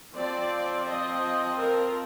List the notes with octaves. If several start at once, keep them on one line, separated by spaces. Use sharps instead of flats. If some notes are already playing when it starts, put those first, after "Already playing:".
F3 C4 D5
D#5
A#4